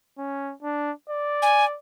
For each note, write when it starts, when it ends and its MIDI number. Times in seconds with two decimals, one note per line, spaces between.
0.18 0.53 61
0.63 0.92 62
1.09 1.77 74
1.42 1.65 80